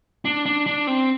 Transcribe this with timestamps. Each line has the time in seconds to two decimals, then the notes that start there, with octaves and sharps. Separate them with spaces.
0.25 D4
0.46 D4
0.67 D4
0.87 C4